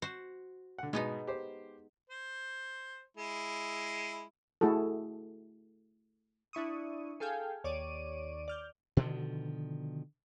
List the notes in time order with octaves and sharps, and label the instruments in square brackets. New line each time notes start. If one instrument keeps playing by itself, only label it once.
[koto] F#4 C5
[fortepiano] D3 F#5
[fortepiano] G#2 B2 [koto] G#3 B3 D#4
[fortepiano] G4 C5
[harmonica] C5
G#3 E4
[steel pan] A3 E4 F#4 G#4 A4
[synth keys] D4 E4 C#6 D#6
G#4 A4 F5 G5 G#5
D#2 C#5 D5 D7 D#7
D5 F6 G6
[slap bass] B2 D3 D#3 F3